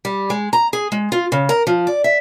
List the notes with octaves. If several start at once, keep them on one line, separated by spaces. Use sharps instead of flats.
G3
G#3
A#5
G#4
G#3
F4
C#3
A#4
F3
D5
E5